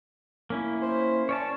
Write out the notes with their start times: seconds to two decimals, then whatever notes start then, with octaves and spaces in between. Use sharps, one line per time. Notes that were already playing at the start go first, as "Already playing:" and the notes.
0.50 A#3 C#4 E4
0.82 C5
1.29 C#4 C#5 D5 A5